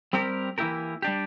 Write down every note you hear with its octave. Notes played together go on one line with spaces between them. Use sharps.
G3 C4 G4 A#4
E3 A#3 E4 G4 A#4
G3 D4 G4